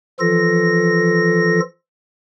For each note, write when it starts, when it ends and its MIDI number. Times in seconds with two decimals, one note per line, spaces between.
0.20 1.60 52
0.20 1.60 53
0.20 1.60 65
0.20 1.60 69
0.20 1.60 94